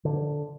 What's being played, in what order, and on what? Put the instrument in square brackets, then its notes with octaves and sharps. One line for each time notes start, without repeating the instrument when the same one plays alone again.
[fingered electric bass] D3